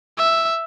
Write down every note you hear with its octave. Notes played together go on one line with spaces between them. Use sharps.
E5